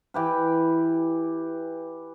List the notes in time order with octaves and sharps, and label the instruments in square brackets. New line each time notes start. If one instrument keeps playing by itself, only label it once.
[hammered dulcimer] E3 G4 B4